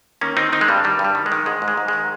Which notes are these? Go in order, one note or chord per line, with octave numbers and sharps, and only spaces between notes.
D#3 A#3 C#4
D#3 C4 D#4
D#3 C4 D#4
G#3
G2 G3
D#3 G3
G2
G3
D#3
G#3
D#3
G#2 G#3
G#2
G#3
G#2
D#3 G#3